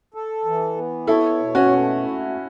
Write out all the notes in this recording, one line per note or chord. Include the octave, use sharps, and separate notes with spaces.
A4
E3
B3
E4 A4 C#5
B2
C#4 F#4
A3
E4